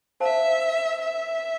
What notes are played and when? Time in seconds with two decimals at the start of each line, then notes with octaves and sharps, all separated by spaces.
0.20 C5 E5 F5 A5
1.02 E5